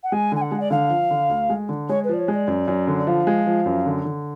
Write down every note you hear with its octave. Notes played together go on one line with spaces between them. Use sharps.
F#5
G#3 G#5
D3 G#5
F#5
G#3
D5
D3 F5
F3
D3
D2
G#3
D3
G#3 C#5
B4
F3 D5
C#5
G#3
D5
F#2
F#2
D3
D5
F3 F5
G#3
F3
F#2
D3
D3